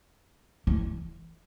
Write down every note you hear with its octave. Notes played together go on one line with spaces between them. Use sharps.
E3